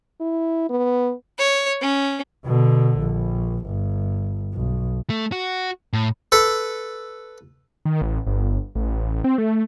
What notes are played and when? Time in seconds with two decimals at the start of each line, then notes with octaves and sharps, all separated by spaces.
0.21 E4
0.70 B3
1.38 C#5
1.81 C#4
2.46 B2 D3
2.99 A#1
3.67 G1
4.54 B1
5.10 A3
5.32 F#4
5.93 A2
6.32 A4 B4
7.85 D#3
8.02 A1
8.27 G1
8.75 A1
9.24 C4
9.38 A3